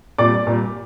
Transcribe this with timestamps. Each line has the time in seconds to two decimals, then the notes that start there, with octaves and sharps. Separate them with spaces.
0.18 A#2 G3 D5 D6
0.47 A#2 G3